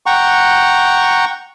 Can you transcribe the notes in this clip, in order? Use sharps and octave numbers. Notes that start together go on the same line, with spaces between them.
F#5 G5 A#5 C#6